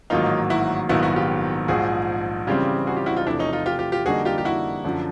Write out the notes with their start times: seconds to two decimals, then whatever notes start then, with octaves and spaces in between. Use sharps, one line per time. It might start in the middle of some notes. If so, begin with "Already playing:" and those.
0.10 A1 G#2 D#3 F#3 A#3 D#4 F4
0.50 E4 F#4
0.89 A#1 G#2 D#3 F#3 B3 E4 F#4
1.02 E4 F#4
1.16 F4 G4
1.68 A#1 G#2 F3 F#4 G#4
2.47 C#3 E3 G3 C4 F4 G4
2.87 F#4 G#4
2.96 F4 G4
3.06 E4 F#4
3.17 D#4 F4
3.27 E2 C3 F3 A3 D4 E4
3.39 C#4 D#4
3.53 D#4 F4
3.66 F4 G4
3.79 F4 G4
3.92 F4 G4
4.06 F2 D3 G3 A#3 D#4 F#4 G#4
4.25 F4 G4
4.38 G4
4.45 E4 F#4
4.84 F#2 D3 F3